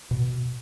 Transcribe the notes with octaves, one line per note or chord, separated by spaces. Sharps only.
B2